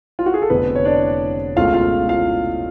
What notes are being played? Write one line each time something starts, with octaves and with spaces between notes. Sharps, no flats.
F4
F#4
G#4
A4
F1 F2 D3 B3 B4
C#5
D4 D5
C#2 B2 A3 F4 F5
F4 F5
F4 F5